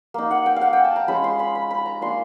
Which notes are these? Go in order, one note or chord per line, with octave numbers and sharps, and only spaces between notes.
A#3 D#4
F#5
G5
F5 F#5
G5
A5
A#5
G#3 C#4 F4 B5
C6
B5
B5
B5
A#5
A#3 D4 F4 C6